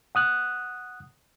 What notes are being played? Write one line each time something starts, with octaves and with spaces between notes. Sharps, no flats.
F#5 D#6 F#6